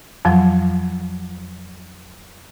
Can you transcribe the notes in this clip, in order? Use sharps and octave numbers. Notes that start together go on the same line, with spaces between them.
F2 F3 F#3